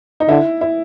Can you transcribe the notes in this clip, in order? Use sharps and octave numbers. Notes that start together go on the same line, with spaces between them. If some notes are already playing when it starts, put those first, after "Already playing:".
D#4
D3 E4
E4